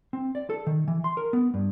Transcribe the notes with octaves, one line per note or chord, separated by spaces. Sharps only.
C4
D5
A4
D#3
E3
C6
A#4
B3
G2